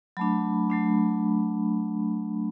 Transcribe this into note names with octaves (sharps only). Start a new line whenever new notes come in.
F#3 A3 D4 B5
F#3 A3 D4